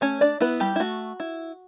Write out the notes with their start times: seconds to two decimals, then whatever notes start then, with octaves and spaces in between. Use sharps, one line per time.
0.01 A3 C#4 C#5
0.21 D4 D5
0.40 B3 E4 B4
0.60 G3 G4
0.76 E4
0.80 A3 F#4
1.20 E4